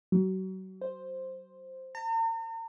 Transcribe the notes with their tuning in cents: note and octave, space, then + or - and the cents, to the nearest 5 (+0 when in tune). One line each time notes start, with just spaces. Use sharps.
F#3 +30
C5 +0
A#5 -45